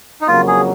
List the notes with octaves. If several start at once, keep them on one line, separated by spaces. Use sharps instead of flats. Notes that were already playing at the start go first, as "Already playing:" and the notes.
D#4
F2 C#3 F#3 A#3 F4
G#4